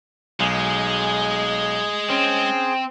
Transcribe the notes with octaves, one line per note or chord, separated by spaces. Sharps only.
B1 G#3 G#4
C4 C#4